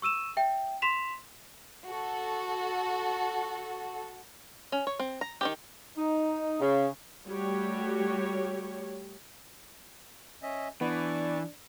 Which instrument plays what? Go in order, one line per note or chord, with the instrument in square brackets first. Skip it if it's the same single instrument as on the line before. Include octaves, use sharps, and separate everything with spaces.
[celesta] C#6 E6 D#7 E7
E5 G5
C6 B6 E7 F7
[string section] F#4 A4
[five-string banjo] C#4
C#5
C4
A#5
D#3 F3 G4
[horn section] D#4
C#3
[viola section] G3 A3 F#4 G4 C#5
[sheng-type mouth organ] C#4 D#5 E5
[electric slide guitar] E3 [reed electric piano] B3 [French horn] D4 [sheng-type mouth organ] D5 C#6